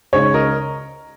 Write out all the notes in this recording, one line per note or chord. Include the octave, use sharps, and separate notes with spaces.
C#2 C#3 G#3 D#4 C#5
A#4 D#5